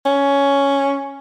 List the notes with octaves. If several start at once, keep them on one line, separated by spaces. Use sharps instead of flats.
C#4